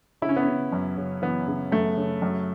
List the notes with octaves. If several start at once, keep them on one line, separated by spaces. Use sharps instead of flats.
C#3 E4
C#4
B3
C#3 C#4
F#2
C#3
E3 B3
C#3
F#2 A3
C#3
F#2